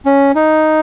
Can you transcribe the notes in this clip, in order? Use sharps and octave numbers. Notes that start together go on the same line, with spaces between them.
C#4
D#4